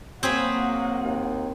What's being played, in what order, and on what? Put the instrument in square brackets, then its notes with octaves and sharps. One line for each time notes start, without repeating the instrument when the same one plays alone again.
[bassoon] F#3 [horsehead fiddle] A#3 F#5 [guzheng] C4 G#4 B5
[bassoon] D#2